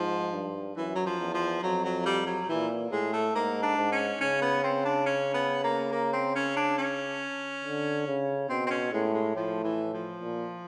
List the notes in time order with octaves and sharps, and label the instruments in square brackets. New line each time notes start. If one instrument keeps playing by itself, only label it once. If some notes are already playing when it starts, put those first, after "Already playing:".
Already playing: [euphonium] G#2 [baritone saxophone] F3
[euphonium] G2
[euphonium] F#2 [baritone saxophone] E3
[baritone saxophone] F#3
F3
[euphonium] E2
[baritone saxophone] F3
[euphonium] F2 [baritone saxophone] F#3
[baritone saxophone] F#3
G3
F#3
[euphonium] A#2 [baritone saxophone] E3
[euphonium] A2 [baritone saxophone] G#3
[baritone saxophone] A3
[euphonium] G#2 [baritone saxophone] A#3
[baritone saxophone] D4
[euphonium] G#2
[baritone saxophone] C#4
[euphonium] C#3 [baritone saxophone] C#4
[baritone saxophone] B3
C4
D4
C#4
B3
A#3
A#3
C4
C#4
D4
C#4
[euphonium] D3
C#3
[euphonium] B2 [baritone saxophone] C4
[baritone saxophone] C4
C#4
[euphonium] A2 [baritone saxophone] G#3
[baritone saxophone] G#3
[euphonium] A2 [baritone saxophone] F3
[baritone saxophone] E3
F3
[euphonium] A#2